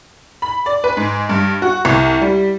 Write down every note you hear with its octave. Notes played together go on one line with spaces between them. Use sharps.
B5
D5
B4
G#2
G2
F#4
C2
G3